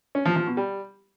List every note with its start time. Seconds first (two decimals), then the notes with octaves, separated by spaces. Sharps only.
0.15 C#4
0.25 F3
0.36 F3
0.47 B2
0.57 G3